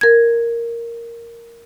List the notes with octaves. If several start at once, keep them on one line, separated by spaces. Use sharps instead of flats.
A#4 G#6